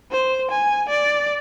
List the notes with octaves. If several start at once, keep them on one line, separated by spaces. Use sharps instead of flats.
C5
G#5
D5